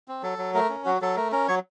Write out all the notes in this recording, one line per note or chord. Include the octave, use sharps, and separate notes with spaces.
C4
F#3 A4
F#3
A3 A#4
C#4
F#3 F#4
F#3 A4
A3 A#4
C#4 A#4
F#3 C#5